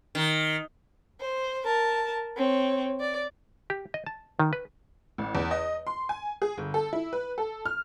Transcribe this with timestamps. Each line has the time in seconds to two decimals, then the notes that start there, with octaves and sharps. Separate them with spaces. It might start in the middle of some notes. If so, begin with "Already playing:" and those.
0.15 D#3
1.21 C5
1.66 A#4 A5
2.37 C4 C#5
3.00 D5
3.70 G4
3.94 D#5
4.06 A5
4.39 D#3
4.53 B4
5.18 A1
5.35 E2
5.51 D#5
5.87 C6
6.09 G#5
6.42 G#4
6.57 G1
6.74 A4
6.93 E4
7.13 B4
7.38 A4
7.66 F6